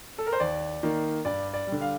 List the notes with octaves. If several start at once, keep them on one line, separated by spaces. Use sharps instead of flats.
A4
A#4
C5
D#2 D5
D#3 A#3 D#4
G2 D5
D5
G3
D3
F5